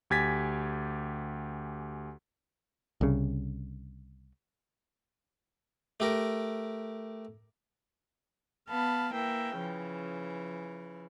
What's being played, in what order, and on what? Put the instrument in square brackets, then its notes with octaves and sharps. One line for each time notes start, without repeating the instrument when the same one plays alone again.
[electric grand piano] D2 G4 G#5 G#6 A6 B6
[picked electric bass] C2 C#3
[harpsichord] A3 G4 A#4
[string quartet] B3 F5 A5 B5
E3 A#3 E5 G5
C#3 E3 F3